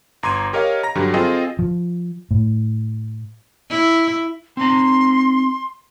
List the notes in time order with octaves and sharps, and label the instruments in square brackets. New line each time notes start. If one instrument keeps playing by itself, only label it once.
[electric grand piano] G1 A#5 C6 D6 G#6 D#7
G4 A#4 C#5 D#5 F5
A#5 A#6
G2 D3 F#3 G3
C4 F4 G#4 A4 D#5 G5
[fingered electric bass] F3
A2
[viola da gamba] E4
[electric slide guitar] C4 D#4 A#5 [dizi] C6